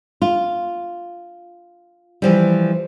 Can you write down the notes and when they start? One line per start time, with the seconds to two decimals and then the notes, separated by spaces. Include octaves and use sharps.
0.22 F4
2.22 E3 F3 G3